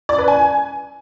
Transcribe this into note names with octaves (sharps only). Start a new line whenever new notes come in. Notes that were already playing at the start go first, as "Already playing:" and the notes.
D5
B4
G#5